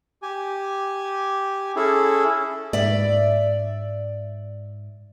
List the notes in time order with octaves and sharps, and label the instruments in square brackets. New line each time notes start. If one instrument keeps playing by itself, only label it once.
[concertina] G4 G#5
C#4 E4 G#4 A4
[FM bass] G#2 [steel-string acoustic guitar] D5 E5